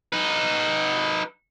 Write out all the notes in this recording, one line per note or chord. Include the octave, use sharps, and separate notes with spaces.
D#4 B4